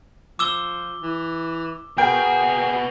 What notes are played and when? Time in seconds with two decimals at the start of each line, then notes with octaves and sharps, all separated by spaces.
0.39 F3 D6 E6 E7 G7
1.02 E3
1.98 B3 F#4 G#4 A#4 G5